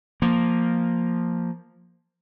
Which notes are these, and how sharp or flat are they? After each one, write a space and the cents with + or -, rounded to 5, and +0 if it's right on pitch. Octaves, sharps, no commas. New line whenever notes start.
F3 +0 A#3 +0